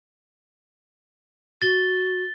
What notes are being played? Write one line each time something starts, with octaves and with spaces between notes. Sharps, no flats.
F#4 A6 G7